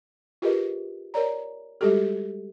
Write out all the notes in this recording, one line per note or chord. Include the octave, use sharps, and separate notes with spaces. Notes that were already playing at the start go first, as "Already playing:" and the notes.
F4 G4 G#4 A#4 B4 D#5
A#4 C#5 D5 A#5
G3 G#3 F#4 G4 A4